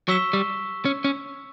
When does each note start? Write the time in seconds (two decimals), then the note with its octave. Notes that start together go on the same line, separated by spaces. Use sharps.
0.08 F#3 C#6 E6 B6 E7 G7
0.33 G3
0.85 C#4
1.04 C#4